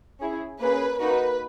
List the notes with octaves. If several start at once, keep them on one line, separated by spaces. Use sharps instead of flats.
C#4 E4 G#4
A#3 C#4 G#4 B4
A#3 D#4 F#4 B4